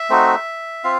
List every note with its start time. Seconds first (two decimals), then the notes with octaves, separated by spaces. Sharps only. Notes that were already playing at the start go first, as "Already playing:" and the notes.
Already playing: E5
0.10 A3 C4 D#4 F#4
0.84 C4 F4 F5